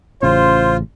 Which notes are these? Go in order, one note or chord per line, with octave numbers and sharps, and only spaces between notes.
A1 C#3 C#4 F4 C5